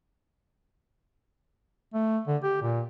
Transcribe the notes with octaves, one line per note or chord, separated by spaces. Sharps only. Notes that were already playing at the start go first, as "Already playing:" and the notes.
A3
D3
G4
A#2